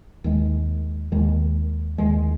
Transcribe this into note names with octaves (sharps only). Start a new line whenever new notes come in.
D#2 D#3 G#3
D#2 D#3 G#3
D#2 D#3 G#3